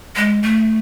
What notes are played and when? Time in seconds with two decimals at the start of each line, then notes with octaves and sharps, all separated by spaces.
0.16 G#3
0.43 A3